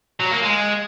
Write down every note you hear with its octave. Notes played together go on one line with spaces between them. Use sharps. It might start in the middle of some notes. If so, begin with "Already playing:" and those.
F#3
A#3
G#3